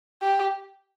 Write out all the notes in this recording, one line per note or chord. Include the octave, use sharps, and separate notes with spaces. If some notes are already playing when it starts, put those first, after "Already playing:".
G4